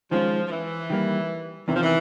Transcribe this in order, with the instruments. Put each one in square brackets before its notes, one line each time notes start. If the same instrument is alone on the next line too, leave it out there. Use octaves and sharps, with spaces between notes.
[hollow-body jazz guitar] D#3 G#3 C#4 F4 [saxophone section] F3
[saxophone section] F3
E3
[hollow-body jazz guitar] D#3 G3 A#3
[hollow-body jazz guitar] E2 C3 D#3 [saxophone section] E3
[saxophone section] F3
E3